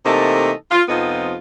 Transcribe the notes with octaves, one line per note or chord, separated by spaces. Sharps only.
C3 E3 A3 A#3 D#4 A4
F4
F2 C3 F3 B3 D#4 F4